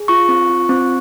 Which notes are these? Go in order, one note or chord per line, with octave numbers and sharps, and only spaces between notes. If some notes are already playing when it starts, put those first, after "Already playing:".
Already playing: G#4
F4 C#6
C4
F4
C4